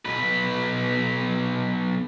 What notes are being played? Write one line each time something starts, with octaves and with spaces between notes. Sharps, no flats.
B1 B4